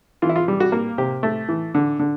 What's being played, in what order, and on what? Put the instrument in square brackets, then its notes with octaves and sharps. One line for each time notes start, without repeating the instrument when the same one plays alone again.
[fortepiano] E3 F4
E4
F4
G3
F#4
A#3
C3 G4
A3
E3
D3
D3